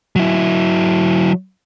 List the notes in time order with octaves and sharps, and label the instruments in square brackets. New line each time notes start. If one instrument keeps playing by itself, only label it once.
[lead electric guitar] F#3 E4